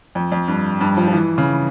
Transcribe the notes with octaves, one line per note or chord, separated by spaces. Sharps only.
F2
F2
G2
G2
F3
F3
E3
C#3